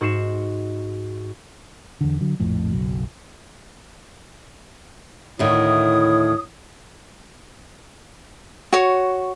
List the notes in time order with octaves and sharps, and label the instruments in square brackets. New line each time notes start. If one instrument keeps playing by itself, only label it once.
[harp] G#2 F#4 C#6 C7 E7
[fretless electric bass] E2 D3
D3 F#3
A#1 F2 A2
F#1 B1 F#3
[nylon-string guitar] D2 A2 D#3 [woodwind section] E4 C#5 D#6
[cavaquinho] F#4 C#5